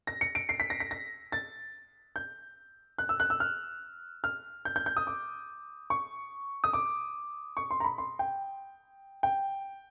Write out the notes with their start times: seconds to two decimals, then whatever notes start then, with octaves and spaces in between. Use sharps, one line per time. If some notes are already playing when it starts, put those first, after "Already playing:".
0.07 A#6
0.21 C#7
0.35 D7
0.49 C7
0.60 B6
0.70 A#6
0.80 B6
0.91 A#6
1.32 A6
2.16 G6
2.98 F#6
3.09 E6
3.20 F#6
3.30 E6
3.40 F6
4.24 F6
4.65 G6
4.76 G6
4.86 G6
4.97 D#6
5.07 D6
5.90 C#6
6.64 D#6
6.73 D6
7.57 C#6
7.71 C6
7.80 A#5
7.84 B5
7.98 C6
8.19 G5
9.23 G5